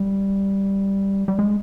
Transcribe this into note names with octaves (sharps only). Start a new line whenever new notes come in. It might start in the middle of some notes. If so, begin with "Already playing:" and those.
Already playing: G3
G3
G#3